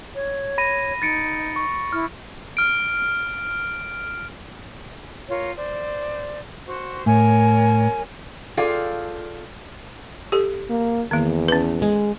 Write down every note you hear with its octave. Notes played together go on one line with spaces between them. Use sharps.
C#5
B5 A#6 D#7
D#4 A6 C#7 D7
C#6
E4 F6
F6 D7
F4 A#4 C#5
C5 D5
F#4 C5
A2 A#4 C#5 G#5
F4 G#4 A4 D5 F5 G5
G4 A4
A#3
E2 D#3 A#3
C#4 B4
G#3